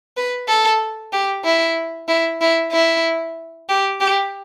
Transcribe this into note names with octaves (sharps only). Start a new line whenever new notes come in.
B4
A4
G4
E4
E4
E4
E4
G4
G4